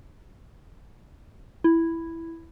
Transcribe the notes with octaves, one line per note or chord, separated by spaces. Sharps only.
E4